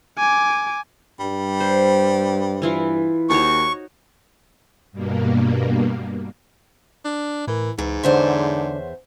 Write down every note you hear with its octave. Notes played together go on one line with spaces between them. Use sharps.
G#5 D6
G2 G3
C5
E3 E4 F4
D#2 D#4 F#4 C#5 C#6
G2 B2 A#3
D4
A2 E3 A#4
C#2 G#2 E3
E2 D3 C5 C#5 E5 F#5 C6